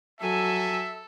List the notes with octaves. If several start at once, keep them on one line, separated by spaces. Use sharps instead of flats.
F#3 A4 E5 G#5